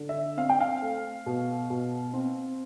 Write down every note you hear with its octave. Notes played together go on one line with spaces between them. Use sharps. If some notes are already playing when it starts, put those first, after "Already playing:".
Already playing: D3
E5
C4 F5
G5
F5
A3
B2
B2
C4